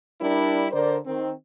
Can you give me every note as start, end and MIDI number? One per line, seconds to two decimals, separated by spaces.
0.21 0.67 55
0.21 0.67 62
0.21 0.67 64
0.21 0.67 70
0.72 0.97 50
0.72 0.97 70
0.72 0.97 72
0.72 0.97 74
1.06 1.31 51
1.06 1.31 60